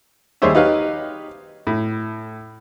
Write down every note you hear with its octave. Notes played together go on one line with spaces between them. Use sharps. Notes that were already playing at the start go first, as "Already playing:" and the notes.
D#2 G3 G#4 C5 C#5 E5
D#4 G4 B4 C#5 F5
A2